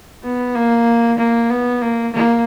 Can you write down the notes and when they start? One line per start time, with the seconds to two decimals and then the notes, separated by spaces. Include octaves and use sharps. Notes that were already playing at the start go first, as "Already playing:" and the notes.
0.23 B3
0.55 A#3
1.18 A#3
1.50 B3
1.81 A#3
2.13 A#3